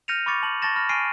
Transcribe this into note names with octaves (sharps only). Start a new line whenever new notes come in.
F6 G6 A#6 C#7 D#7 F7
B5 C#6 D6 A6 C#7
A5 F#7
A5 C#6 A6 A#6 E7
B5 F6 A#6
G#5 C#6 F6 C7 D7 D#7